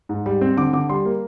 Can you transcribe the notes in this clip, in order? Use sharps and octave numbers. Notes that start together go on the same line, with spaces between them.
G#2
G3
C4
D3 D6
D3 D6
G3 C6
A#3